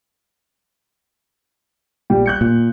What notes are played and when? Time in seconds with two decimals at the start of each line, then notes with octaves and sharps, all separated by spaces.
2.10 A#1 G3 G5
2.26 F#6 G6 C#7
2.41 A#2